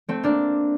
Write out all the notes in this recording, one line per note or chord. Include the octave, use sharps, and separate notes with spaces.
A3 C4
A#3 D4